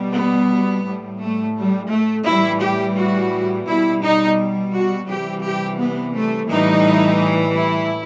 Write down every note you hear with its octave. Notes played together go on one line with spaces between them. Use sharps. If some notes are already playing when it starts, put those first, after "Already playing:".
Already playing: B2 G3
B3
A2 G3
A3
G3
A3
A2 E3 G3 E4
G4
F#4
B2 G3 E4
D#4
F#4
C3 E3 G3 G4
G4
B3
A3
A2 E3 G3 D#4
E4